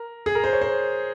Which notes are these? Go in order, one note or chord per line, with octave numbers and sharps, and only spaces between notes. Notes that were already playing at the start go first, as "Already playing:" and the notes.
Already playing: A#4
G#4
A#4
C5
C#5
C5